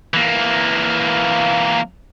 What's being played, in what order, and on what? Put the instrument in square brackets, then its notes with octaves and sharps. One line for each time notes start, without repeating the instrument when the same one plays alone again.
[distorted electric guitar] E3 A#3